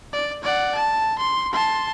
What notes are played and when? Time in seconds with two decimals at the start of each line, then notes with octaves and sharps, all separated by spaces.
0.13 D5
0.44 D5 F#5
0.75 A5
1.19 C6
1.53 A5 C6